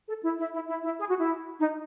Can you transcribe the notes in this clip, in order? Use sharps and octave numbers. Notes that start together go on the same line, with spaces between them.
A4
E4
E4
E4
E4
E4
G#4
F#4
E4
D#4